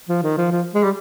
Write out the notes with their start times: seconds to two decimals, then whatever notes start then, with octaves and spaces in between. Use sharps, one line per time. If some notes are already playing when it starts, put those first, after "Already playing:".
0.09 F3
0.23 D#3
0.37 F3
0.52 F3
0.75 G#3
0.84 G3